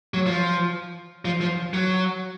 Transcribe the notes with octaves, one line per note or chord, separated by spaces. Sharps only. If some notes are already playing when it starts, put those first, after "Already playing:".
F#3
F3
F3
F3
F#3